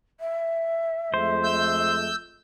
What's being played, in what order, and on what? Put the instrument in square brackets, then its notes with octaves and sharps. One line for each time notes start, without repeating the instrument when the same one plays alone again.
[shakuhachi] E5
[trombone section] F2 G#3 A3 [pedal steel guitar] C5
[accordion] E6 G6